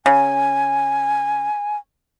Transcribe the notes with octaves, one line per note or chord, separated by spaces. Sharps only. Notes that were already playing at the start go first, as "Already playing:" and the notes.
C#3 G#5